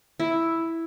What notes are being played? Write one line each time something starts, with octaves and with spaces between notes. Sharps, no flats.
E4